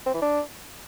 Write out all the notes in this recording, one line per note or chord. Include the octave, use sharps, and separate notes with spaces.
C4
E3
D4